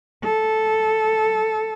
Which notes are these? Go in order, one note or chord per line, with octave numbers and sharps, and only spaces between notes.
A4